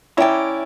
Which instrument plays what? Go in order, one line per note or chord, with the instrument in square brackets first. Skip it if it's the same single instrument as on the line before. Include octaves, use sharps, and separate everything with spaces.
[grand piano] C#4 E4 [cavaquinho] D5 G5 A#5